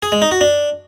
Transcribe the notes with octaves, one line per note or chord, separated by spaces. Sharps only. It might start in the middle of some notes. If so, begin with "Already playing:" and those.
G#4
G#3
D#4
F#4
D4